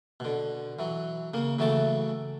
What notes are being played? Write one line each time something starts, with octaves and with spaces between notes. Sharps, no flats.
B2 D3
E3 F#3
C#3 A#3
C#3 E3 F#3 A3 A5 D6